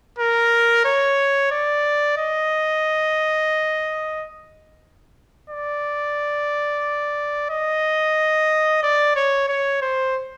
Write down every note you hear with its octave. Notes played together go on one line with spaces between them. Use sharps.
A#4
C#5
D5
D#5
D5
D#5
D5
C#5
C#5
C5